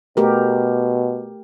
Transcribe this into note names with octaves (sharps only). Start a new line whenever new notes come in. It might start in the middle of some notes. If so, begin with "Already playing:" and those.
B2 A3 G4 A#4